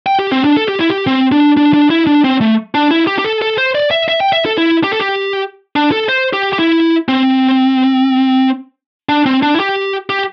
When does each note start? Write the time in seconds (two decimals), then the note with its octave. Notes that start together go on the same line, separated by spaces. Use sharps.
0.06 G5
0.19 G4
0.32 C4
0.44 D4
0.57 A4
0.68 G4
0.79 E4
0.90 G4
1.07 C4
1.32 D4
1.57 D4
1.74 D4
1.90 E4
2.07 D4
2.24 C4
2.41 A3
2.75 D4
2.91 E4
3.07 G4
3.19 G4
3.24 A4
3.42 A4
3.58 C5
3.75 D5
3.91 E5
4.09 E5
4.20 G5
4.33 E5
4.46 A4
4.58 E4
4.84 G4
4.92 A4
5.00 G4
5.76 D4
5.92 A4
6.09 C5
6.33 G4
6.53 G4
6.59 E4
7.08 C4
9.09 D4
9.26 C4
9.43 D4
9.54 E4
9.60 G4
10.10 G4